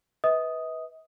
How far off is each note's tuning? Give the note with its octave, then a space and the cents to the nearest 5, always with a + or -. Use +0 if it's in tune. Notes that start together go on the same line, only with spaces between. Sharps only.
B4 +0 D#5 +45 D#6 +0